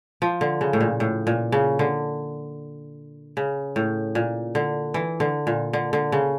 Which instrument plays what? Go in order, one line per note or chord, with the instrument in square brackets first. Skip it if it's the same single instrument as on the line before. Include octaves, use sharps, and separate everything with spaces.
[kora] F3
D3
C#3
A2
A#2
A2
A#2
C#3
D3
C#3
A2
A#2
D3
E3
D3
A#2
D3
D3
C#3